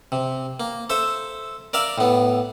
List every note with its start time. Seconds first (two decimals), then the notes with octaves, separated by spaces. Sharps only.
0.12 C3
0.60 A#3
0.90 A4 C5 E5
1.73 A#4 D5 E5 F5
1.98 A2 B3